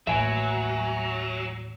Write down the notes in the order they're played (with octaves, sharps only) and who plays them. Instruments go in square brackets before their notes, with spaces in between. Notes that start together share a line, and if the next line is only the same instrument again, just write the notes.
[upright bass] A1 D#2 [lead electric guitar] F#3 [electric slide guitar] E5 G#5